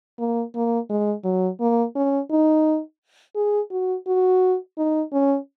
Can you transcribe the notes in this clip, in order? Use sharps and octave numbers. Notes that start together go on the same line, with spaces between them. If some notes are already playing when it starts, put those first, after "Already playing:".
A#3
A#3
G#3
F#3
A#3
C#4
D#4
G#4
F#4
F#4
D#4
C#4